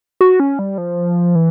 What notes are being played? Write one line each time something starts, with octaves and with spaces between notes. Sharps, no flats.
F#4
C#4
G3
F3
E3